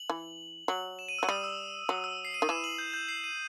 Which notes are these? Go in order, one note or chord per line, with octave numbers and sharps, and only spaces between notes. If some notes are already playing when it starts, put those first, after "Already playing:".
Already playing: F#7
E3
F#3 F#7
E7
D#7
F#3 E6
G3 D#6
E6
F#3 D#6
E6
C7
D#7
D#3
E3 E7
F#7
G6
G6
C7
D#7